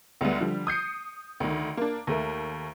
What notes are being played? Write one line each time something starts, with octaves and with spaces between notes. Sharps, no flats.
D2 G3 G#3 B3
D3 F3 G3
D#6 G6 C7 C#7
D2 D#3
A#3 D4
D#2 A3 A#4